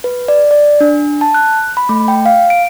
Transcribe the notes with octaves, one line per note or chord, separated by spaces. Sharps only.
B4
D5
D5
D4
A5
F#6
B5
A3
G5
F5
D7